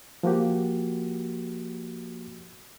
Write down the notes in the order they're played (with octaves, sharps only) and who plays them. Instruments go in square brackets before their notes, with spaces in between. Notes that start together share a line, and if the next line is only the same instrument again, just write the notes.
[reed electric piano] F3 A#3 F#4 G4